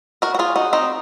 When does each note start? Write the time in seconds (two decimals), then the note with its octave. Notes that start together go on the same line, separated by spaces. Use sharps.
0.22 F#4 A#4
0.35 F#4
0.39 F4 G#4
0.56 D#4 F#4
0.73 C4 D#4